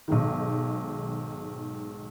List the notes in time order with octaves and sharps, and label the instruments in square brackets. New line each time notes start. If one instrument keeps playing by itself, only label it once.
[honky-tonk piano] B1 G#2 D#3